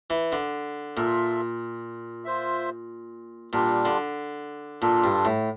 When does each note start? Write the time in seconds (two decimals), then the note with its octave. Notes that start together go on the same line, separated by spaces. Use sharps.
0.10 E3
0.32 D3
0.97 A#2 F4 A4 E5
2.25 F4 C5 E5
3.53 A#2 G3 D4 F4
3.85 D3
4.82 A#2 D4 F4 A4
5.04 G2
5.25 A2